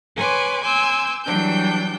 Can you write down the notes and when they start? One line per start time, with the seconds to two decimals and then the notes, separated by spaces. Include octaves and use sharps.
0.16 B4 C#5 G#5 C6 D6
0.62 G#5 C6 D6 E6 G6
1.25 E3 F#3 G3 D4 G5 G6